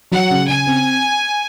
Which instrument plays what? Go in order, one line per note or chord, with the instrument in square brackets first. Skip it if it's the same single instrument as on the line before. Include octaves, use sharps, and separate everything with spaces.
[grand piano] F#3 [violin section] F#5
[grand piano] C#3
[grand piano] C#3 [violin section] G#5
[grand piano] C4